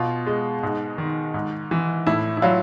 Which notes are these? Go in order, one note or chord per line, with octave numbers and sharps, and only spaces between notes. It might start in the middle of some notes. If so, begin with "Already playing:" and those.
Already playing: B2 F4
G#3
G#2
D#3
G#2
E3
A2 E4
E4
F#3 F4